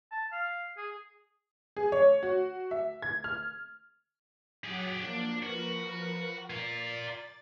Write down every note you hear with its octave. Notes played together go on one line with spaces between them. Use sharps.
A5
F5
G#4
G#4
C#5
F#4
E5
G#6
F6
F#3 G4 G#4 F#5 A6
F3 A#3 D4
F3 F#4 A#4 B4
F4 A#4 D5 A6